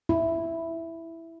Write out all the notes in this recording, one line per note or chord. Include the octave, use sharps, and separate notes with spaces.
E4